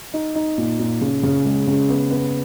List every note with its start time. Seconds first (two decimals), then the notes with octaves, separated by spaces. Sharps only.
0.14 D#4
0.35 D#4
0.58 A#2
0.79 A#2
1.01 C#3
1.23 C#3
1.45 G#3
1.67 C#3
1.89 B3
2.11 B3